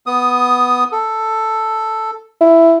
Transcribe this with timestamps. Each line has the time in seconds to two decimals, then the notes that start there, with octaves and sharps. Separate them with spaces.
0.06 B3 D#6
0.92 A4
2.41 E4